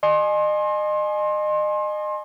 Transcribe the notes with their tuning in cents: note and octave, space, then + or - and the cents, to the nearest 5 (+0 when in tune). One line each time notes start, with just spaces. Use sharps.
D#5 -35 G#5 +20 C6 +30